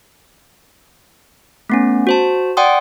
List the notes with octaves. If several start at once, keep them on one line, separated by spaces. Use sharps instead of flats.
A3 B3 C#4
F#4 C5 A5
D5 F#5 G5 C6 D#6